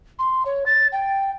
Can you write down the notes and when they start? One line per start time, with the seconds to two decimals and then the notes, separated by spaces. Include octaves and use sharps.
0.18 C6
0.45 C#5
0.66 A6
0.92 G5